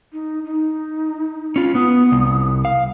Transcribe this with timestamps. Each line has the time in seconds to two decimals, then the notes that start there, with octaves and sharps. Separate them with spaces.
0.13 D#4
0.45 D#4
1.56 C#4 F4
1.75 B3 D#6
2.12 C2
2.65 F5